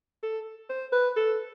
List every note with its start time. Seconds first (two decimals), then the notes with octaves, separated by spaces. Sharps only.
0.23 A4
0.69 C5
0.92 B4
1.16 A4